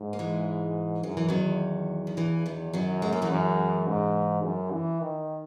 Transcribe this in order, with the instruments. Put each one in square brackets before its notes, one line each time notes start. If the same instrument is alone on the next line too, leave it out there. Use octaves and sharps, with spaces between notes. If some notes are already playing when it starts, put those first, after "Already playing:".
Already playing: [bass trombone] G#2
[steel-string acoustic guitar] A#3
E3 G#3
[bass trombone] F#2 [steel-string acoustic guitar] F#3
[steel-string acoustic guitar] E3
[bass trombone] E2 [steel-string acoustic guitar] D#3 F#3
[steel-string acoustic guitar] D#3
C#3 E3
D#3 F#3
[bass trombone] F#2 [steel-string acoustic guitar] D#3 F#3
[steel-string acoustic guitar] G#3
A#3
E3 G#3
[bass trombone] F#2
G#2
F#2
E3
D#3